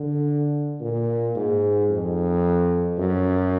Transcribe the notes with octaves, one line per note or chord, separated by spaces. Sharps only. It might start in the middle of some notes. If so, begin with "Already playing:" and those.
Already playing: D3
A#2
G#2
F2
F#2